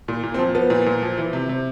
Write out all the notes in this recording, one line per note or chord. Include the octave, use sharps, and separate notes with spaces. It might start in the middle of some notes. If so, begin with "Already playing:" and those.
A#2
A#2
C4
F3
F3 B3
A#2
A#2
F3
E3
C3
C3